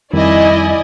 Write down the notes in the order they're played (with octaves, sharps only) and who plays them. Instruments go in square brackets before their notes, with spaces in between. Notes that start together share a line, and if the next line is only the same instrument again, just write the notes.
[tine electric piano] F2 D#3 G3 [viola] E4 [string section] D5 D#5 G#5